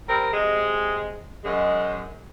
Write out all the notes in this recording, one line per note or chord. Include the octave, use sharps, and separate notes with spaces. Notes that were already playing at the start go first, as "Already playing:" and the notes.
G3 C4 A#4
C3 G#3
F#2 G#3